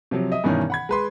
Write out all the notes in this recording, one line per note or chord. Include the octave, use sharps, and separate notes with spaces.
C3 F3 F#3
D#5 E5 D#6
G2 B2 D#3 E3 C#4 D#4
F#5 B5 G#6
G#3 B4 C6